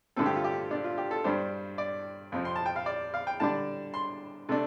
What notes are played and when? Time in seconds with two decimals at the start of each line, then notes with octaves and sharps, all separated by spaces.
0.16 G2 D3 A3 C4 A4
0.26 G4
0.36 F4
0.44 G4
0.71 D4
0.84 F4
0.98 G4
1.11 A4
1.24 G2 G3 D4 C5
1.78 D5
2.32 F2 C3 F3 C4
2.45 C6
2.56 A5
2.66 G5
2.76 F5
2.86 D5
3.14 F5
3.27 G5
3.40 D3 G3 D4 A5
3.94 C6
4.49 C3 A3 D4